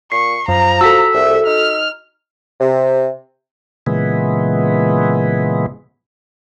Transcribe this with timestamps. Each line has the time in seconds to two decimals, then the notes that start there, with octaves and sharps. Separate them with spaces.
0.12 A#2 C#6 C7
0.48 F#2 F3 A#5
0.81 F#4 A4 E6 B6
1.14 C2 E5
1.47 D#4 F6
2.60 C3
3.87 A#2 C#3 E3 G#3 B3